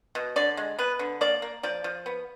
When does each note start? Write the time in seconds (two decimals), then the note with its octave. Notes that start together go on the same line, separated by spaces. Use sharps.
0.15 B2
0.36 D3 D5
0.57 G#3
0.79 B3 B4
0.99 D3
1.21 A#3 D5
1.42 A#3
1.63 F3 D5
1.84 F3
2.06 B3